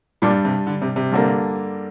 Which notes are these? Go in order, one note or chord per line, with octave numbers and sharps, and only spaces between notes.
G2 A#2 G3 D4
C3
D3
C3
C3
G2 D3 A#3